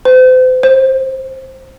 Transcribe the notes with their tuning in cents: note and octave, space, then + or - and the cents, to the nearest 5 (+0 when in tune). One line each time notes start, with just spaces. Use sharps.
C5 -40
C5 +15